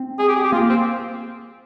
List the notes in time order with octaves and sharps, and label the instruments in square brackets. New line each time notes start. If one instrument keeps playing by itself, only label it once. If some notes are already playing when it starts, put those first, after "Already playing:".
Already playing: [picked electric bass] C4
[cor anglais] G#4
G4
G#4
G4
[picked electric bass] A#3 [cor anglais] F4
[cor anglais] C4